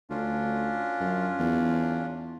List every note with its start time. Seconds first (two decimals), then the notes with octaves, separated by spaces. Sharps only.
0.10 D2 C#4 D4 F4
1.01 F#2
1.39 E2